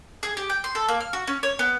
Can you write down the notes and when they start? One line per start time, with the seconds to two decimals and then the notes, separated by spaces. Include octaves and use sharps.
0.23 G#4
0.37 G4
0.50 G5
0.64 C6
0.75 A4
0.88 A#3
1.00 F6
1.13 F#4
1.27 C#4
1.43 C#5
1.59 B3